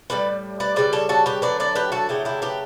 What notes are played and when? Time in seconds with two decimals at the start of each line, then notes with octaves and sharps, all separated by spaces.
0.10 A2 G3 B4 D5
0.60 B4 D5
0.76 C#3 G3 B4 D5
0.93 A4 C#5
1.09 F#4 A4
1.26 G4 B4
1.42 D3 F#3 A3 B4 D5
1.60 B4 D5
1.75 G4 B4
1.92 F#4 A4
2.09 C#3 F#3 A3 E4 G4
2.25 E4 G4
2.42 G4 B4